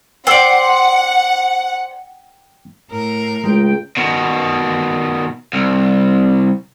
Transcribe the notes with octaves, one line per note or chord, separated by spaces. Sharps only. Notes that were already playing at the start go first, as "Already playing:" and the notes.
C5 D5 F#5 G5 E6
A2 A#4
C#2 G#3 G5
B2 D#3
C2